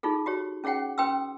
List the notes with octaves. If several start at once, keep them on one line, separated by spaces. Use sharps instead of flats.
D#4 F4 G#4 A4
F#4 G4 C#5
C#4 G#4 C#5 F#5 G5
C#4 B4 G5 C6 D#6 E6